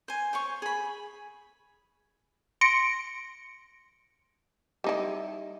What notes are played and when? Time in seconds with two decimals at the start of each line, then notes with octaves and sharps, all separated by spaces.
0.08 C5 G#5
0.33 C5 C#5 C#6
0.62 G#4 B5
2.61 C6 A#6 C#7 D7
4.84 G3 D#4 E4